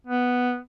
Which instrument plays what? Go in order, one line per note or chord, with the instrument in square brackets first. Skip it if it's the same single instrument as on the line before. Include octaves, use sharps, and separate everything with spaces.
[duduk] B3